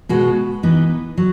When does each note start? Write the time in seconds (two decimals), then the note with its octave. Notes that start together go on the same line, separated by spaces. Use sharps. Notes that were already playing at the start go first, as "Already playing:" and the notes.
0.09 B2 G#3 B3 F#4
0.63 E3 B3 D#4
1.17 F#3